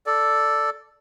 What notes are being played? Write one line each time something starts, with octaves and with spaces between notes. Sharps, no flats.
A4 D5